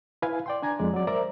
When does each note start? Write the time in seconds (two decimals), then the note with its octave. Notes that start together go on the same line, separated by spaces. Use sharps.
0.22 E4 B4 F5 G#5
0.46 D5 G5 C6
0.62 D4 G#5 A#5 G#6
0.79 F2 G#3 D5
0.94 F#3 D5
1.07 A#4 C5 D5 E5 A#5